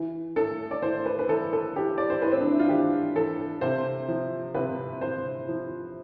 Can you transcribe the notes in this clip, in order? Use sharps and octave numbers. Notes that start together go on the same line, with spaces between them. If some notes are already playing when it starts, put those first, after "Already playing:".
Already playing: E3
A2 A4
D5
A2 C5
B4
B4
E3 A4
A4
E3 G4
D5
C5
A2 B4
C4
D4
E4
F4
E3 G4
E3 A4
C3 C5
F3
C3 B4
C3 C5
F3